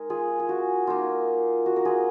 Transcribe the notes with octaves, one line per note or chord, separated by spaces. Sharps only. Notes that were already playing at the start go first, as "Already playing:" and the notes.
Already playing: G#3 D#4 A#4
F4 G#4
G#4
F#4
A#3 D#4 F4
F#4
A#4
F4 G#4